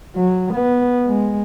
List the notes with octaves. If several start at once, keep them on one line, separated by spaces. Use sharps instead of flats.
F#3
B3
G#3